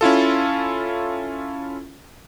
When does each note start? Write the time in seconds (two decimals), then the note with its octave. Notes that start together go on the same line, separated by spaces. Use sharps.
0.01 C#4 E4 F4 A4